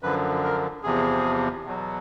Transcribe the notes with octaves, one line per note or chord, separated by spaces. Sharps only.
F#2 D3 F3 B4
A#4
E2 C3 F3 G#4
E2 B2 F#3